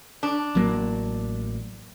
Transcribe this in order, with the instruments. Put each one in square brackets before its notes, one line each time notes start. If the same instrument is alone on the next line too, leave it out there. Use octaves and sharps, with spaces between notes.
[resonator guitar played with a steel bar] D4
[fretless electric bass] A1 F#3 A#3